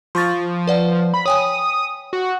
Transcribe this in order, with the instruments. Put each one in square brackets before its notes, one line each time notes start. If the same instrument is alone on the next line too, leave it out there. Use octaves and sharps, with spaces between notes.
[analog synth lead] F3 [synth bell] C6 C#6 A6
[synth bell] B4 D5 F#5
[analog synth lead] B5
[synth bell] C#5 G5 G#5 [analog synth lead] D#6
[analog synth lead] F#4